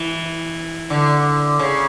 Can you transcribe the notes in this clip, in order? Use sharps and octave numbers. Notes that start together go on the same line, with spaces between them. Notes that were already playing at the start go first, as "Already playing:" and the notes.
Already playing: E3
D3
C#3